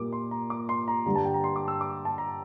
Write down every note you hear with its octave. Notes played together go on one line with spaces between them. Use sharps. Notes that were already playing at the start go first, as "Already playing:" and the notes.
Already playing: A#2 G3 A#3 D6
C6
A#5
D6
C6
A#5
G2 D3 G3 A#5
A5
G5
A#5
C6
D6
E6
D6
A5
A#5